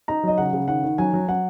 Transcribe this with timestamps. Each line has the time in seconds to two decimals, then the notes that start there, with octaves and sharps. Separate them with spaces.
0.08 D#4 A#5
0.23 F#3 D#5
0.38 C#3 F#5
0.53 C#3
0.68 D#3 F#5
0.84 D#3
0.98 F#3 G#5
1.13 F#3
1.28 F#3 F#5